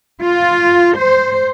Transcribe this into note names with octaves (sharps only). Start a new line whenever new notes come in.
F4
C5